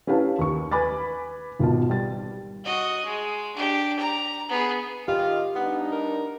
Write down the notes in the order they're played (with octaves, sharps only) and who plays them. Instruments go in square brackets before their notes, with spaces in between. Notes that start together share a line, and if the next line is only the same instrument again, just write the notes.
[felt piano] C#4 E4 G4 B4 F5 A5
D#2 C#6
B4 G#5 B5 D6 A6
G#1 B2 F4 A5
G3 A6
[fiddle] F#4 D#5
G#3
D4 G4
A#5
B3 G#4
[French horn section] D#3 D#5 [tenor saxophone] F4 [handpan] G4
[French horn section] G3 D4 D#4 [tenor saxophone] B3
[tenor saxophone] A#4